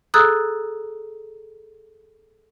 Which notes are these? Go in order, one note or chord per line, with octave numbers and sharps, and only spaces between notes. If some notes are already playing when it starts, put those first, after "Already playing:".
G#4 A4 A#5 D#6 E6 F#6